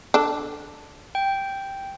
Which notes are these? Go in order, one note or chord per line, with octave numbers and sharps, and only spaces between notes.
D4 A4
G5